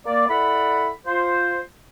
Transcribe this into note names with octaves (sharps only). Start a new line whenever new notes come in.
A#3 D5
E4 A4 D5 F#5 B5
F4 C5